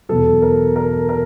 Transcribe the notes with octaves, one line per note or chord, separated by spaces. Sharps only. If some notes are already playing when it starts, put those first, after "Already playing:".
E2 B2 F#3 A4
A#4
A#4
A#4